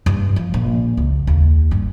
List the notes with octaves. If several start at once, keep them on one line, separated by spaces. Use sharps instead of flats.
G2
F3
A#1
C#2
D#2
G2